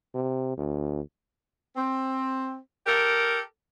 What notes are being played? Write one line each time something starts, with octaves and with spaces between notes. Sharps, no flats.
C3
D2
C4
G4 A4 A#4